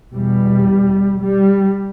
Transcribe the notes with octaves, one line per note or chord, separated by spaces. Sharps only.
E2 B2 G3
G3